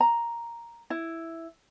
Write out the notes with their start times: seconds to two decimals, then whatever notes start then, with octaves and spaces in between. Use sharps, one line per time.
0.01 A#5
0.90 E4